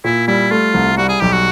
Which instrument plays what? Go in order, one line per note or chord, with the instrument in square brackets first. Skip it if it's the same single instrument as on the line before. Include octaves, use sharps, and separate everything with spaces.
[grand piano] A#2 [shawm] E4
[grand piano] G3 [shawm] E4
[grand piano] A3 [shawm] F4
[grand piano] C2
[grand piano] G3 [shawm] F#4
[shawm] G#4
[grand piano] B1 [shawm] G4
[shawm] F#4